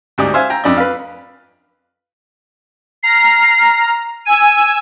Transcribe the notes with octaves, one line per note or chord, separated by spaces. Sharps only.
D2 G#2 G4 D5 D#6
C5 E5 F5 G#5
G5 A#5
F2 D4 D5 D#5
B4 F5
A#5 F6 C7
G#5 E6 D#7